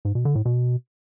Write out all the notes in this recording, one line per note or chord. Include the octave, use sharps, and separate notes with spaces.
G#2
B2
D3
A2
B2